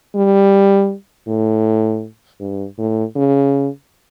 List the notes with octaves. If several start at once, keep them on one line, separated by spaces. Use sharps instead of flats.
G3
A2
G2
A2
C#3